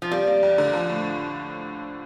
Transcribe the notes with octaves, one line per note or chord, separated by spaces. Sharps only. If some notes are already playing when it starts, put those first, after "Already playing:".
F3
G3 A#3
A#3
F2
D3
F3
A2